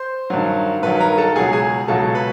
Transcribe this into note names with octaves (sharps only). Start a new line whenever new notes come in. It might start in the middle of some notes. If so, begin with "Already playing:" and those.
Already playing: C5 C6
G2 D#3 F#3
G2 D#3 F#3 B4 B5
A#4 A#5
A4 A5
C#2 B2 F#3 G#4 G#5
G#4 G#5
C#2 B2 F#3 A4 A5
B4 B5